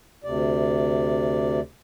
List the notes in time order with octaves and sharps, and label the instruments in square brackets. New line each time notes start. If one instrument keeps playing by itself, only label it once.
[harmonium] D2 C3 D5